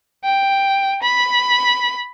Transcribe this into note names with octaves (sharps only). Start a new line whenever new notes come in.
G5
B5